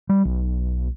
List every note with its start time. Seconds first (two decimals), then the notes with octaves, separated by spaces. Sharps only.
0.09 G3
0.25 B1